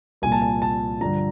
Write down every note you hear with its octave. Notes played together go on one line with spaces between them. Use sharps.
C2 A#2 F3 G#5
A5
G#5
A5
G2 D3 F3 A#5